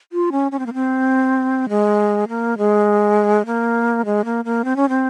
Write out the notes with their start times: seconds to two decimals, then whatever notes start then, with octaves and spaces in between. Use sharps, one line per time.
0.12 F4
0.32 C#4
0.52 C#4
0.59 C4
0.66 A#3
0.74 C4
1.69 G#3
2.28 A#3
2.58 G#3
3.46 A#3
4.05 G#3
4.25 A#3
4.45 A#3
4.65 C4
4.76 C#4
4.89 C4